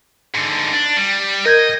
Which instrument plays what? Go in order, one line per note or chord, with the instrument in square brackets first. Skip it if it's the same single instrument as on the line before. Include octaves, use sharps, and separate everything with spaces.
[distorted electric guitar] G#2 D3
D4
G3
[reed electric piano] A#4 G6 G#6 [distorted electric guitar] D#5